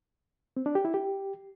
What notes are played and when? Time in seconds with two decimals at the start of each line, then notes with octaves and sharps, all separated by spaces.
0.57 C4
0.66 D4
0.75 G4
0.85 E4
0.94 G4